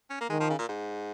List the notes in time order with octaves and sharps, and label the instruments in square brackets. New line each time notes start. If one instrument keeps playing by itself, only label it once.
[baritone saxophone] C#4
A#3
[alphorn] D#3 [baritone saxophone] G#3
[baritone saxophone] F3
C#3
A#2
G#2